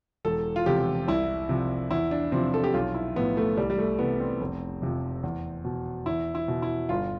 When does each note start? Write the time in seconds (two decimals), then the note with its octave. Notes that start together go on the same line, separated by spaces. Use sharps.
0.25 E1 A4
0.56 F4
0.66 E2 C3 F3 G4
1.07 C2 E4
1.49 C3 F3
1.91 E2 E4
2.11 D4
2.32 C3 F3 C4
2.54 A4
2.64 G4
2.74 B1 F4
2.94 E4
3.16 A2 F3 B3
3.37 A3
3.57 C2 G3
3.70 G3
3.78 A3
3.99 C3 E3 B3
4.20 C4
4.41 F1
4.82 F2 C3 F3
5.23 E2
5.64 B2
6.06 E2 E4
6.35 E4
6.48 B2
6.62 E4
6.89 G1 F4